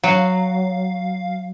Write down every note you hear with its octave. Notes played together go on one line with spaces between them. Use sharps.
F#3 F5